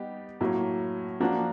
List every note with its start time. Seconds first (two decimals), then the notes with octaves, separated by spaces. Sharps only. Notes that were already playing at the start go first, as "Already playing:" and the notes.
Already playing: G3 B3 D#4 G4
0.41 A2 F#3 A#3
1.20 F3 A#3 D4 F#4